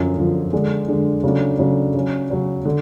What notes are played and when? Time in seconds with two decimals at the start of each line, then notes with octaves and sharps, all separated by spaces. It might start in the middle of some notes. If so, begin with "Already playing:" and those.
Already playing: F#2 D3 F3
0.17 F#2 D3 F3
0.53 D3 G#3 D4
0.88 D3 G#3 D4
1.24 C#3 F#3 A3 D4
1.59 C#3 F#3 A3 D4
1.95 C#3 F#3 C#4
2.30 C#3 F#3 C#4
2.65 D3